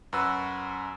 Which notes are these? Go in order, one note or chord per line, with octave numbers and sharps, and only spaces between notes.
F#2 F#4 B4 E6